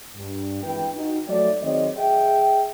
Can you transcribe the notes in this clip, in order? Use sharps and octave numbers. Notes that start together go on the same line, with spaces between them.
G2
G#1 E3 B4 G5
D#4 F#4
F#3 A3 D5
D#3 F#3 C4 G#4 C#5 D#5
G#4 D#5 E5 G5